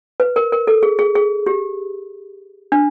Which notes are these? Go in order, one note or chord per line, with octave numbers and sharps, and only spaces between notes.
B4
A#4
A#4
A4
G#4
G#4
G#4
G4
D4